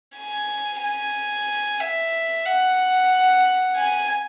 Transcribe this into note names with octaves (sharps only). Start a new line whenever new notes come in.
G#5
G#5
E5
F#5
G#5